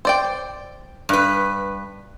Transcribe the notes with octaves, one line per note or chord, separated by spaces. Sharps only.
C5 D5 G5
G2 B4